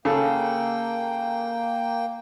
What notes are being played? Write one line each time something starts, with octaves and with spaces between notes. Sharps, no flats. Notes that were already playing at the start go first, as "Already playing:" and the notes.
C#3 A#3 A4 G5